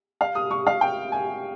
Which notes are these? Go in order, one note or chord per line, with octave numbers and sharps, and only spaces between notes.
F5
D#6
C#6
F5
G5
G#5